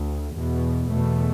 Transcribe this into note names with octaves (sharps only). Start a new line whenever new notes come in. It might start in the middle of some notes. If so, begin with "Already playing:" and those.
Already playing: D2
E2 B2
E2 B2 A3